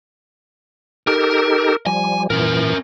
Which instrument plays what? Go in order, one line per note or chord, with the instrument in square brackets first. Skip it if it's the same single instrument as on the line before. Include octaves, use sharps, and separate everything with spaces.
[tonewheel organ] D#4 G4 A4 [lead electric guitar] A#4
[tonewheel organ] F3 G3 [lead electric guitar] G#5
[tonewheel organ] A#2 E3 [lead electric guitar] C#4 A#4